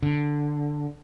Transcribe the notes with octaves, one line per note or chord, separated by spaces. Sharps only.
D3